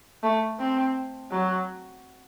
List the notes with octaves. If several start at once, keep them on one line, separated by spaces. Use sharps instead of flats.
A3
C4
F#3